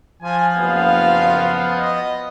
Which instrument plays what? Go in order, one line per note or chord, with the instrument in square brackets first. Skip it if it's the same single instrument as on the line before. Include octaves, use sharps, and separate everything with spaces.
[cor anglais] F3 [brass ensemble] G#5
[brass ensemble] F#1 F5 [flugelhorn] B3
[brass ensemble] D#5